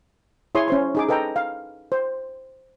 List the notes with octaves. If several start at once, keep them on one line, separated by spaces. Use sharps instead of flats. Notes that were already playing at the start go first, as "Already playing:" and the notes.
E4 G#4 C#5 C6 D#6
C#4 C5 C6
D#4 G#4 D6
A4 B4 D#5 G5 A#5
F5
C5